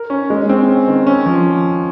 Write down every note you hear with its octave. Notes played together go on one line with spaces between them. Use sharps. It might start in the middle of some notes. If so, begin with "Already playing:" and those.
Already playing: A#4
C#4
G#3
C4
C#4
D#3
C#4
F3